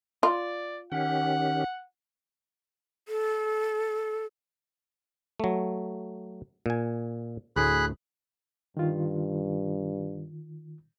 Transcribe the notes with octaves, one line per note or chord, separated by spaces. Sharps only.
F4 D5
D#3 C#4 G4 F#5
A4
F#3 A3
A#2 G#5
D2 A2 G#4 B5 F#6
G2 D#3 F4